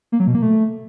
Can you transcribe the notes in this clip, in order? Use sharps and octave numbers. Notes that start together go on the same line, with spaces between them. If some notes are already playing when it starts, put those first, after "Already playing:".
A#3
F#3
B2
A#3
A3